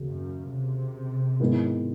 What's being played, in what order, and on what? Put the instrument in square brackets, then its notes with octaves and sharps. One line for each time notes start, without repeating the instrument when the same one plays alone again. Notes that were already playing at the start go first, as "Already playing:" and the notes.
Already playing: [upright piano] D#2 C#3 F#3
[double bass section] F#2
C3
[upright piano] G#2 D#3 G#3 B3 E4